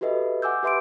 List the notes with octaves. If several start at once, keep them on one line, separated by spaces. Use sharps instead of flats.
F#4 G4 A4 B4 D#5 E5
F#5 G#5 D6 E6 G6
G4 B4 E5 C6 D6 D7